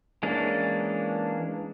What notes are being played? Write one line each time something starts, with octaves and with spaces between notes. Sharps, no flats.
E3 G#3 A#3 C#4 D4